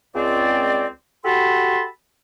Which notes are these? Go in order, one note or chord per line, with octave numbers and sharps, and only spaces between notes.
C#2 C4 D5
F#4 G4 A4 A5 B5 C6